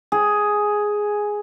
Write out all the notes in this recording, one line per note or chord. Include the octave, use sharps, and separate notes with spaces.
G#4